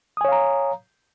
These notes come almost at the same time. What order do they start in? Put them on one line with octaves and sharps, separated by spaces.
D#6 G#5 C#5 F5 A#5